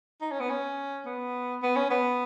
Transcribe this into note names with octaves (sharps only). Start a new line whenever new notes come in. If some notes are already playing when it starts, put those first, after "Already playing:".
D#4
C#4
B3
C#4
B3
B3
C#4
B3